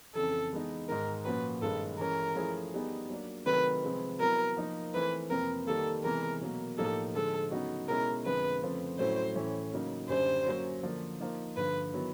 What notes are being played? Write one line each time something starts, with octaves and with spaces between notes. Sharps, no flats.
F2 C#3 E3 A4
E3 G#3 B3 D#4
G#2 D#3 G#3 A#4
A#2 F3 A#3 C#4 F#4 B4
G2 D#3 G#3 C#4 A4
E3 G#3 C#4 A#4
F3 A3 C#4 E4 G#4
G3 B3 D#4 G#4
F#3 A#3 D4
C3 D#3 F#3 A3 B4
C3 F3 G#3 C4
F#3 B3 E4 A#4
F3 A#3 D#4
E3 A3 C4 E4 B4
F2 C3 F3 A#3 A#4
D#3 G3 A#3 A4
C3 E3 G#3 B3 A#4
B2 F#3 A#3
A2 F3 A#3 D#4 G4 A4
D3 F3 G#3 A4
C#3 F#3 B3 D#4 F#4
B2 G#3 C#4 E4 A#4
F2 D3 F3 G#3 B4
F2 C#3 F3 A3 C4
A2 F#3 A3 C#4 E4 C5
A2 E3 A3 C#4 E4
C#3 F#3 A#3 D#4
F#2 D3 G3 C5
F#3 A#3 C#4
D3 F3 A#3 D4
F3 A#3 D#4
G2 D3 F3 B4
D#3 F#3 B3 E4